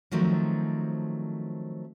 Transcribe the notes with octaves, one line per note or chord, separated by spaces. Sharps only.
D#3 F3 F#3 A3 C4